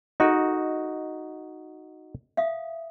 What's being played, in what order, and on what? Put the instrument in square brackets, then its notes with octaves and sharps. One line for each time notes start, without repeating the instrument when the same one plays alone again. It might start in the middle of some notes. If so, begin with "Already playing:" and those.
[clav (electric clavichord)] D#4 F#4 [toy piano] G#4 A4 D#5
[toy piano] E5 F5 D#6